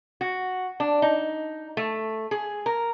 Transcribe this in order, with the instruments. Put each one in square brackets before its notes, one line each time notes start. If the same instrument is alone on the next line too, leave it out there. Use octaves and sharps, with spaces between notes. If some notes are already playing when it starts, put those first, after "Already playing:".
[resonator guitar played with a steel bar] F#4
D4
D#4
A3
G#4
A#4